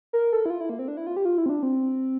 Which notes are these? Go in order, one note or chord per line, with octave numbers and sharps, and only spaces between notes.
A#4
A4
E4
F4
E4
A#3
C4
D4
E4
F4
G4
F4
E4
C4
D4
C4